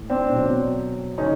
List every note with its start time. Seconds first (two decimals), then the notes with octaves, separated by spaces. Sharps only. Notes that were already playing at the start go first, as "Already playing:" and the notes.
Already playing: A2 E3
0.10 C4 D4
0.31 B2 F#3
1.18 C#3 C#4 D#4